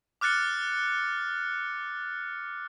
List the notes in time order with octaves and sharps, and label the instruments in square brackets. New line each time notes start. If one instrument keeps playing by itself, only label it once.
[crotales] D6 F6 F#6 A6 C#7